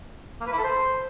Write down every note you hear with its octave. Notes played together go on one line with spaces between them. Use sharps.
A#3
B4
E4
A4
C5